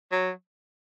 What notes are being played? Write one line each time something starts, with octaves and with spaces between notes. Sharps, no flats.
F#3